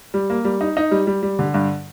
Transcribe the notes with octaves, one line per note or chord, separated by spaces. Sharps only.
G3
A#3
G3
D#4
D#4
G3
G3
G3
D3
G2